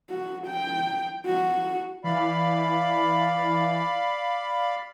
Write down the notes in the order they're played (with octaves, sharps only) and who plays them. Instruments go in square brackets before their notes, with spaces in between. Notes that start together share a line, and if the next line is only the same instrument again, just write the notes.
[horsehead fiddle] F#4
G5
F#4
[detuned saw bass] E3 [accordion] D5 F5 B5